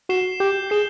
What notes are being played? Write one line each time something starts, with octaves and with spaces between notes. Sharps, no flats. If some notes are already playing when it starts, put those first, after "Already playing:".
F#4 C7 E7 G7
G4 G6
G#4 C7 E7 G7